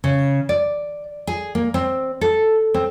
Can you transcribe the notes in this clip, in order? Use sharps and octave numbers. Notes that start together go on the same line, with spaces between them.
C#3
D5
G#4
A#3
C4
A4
C4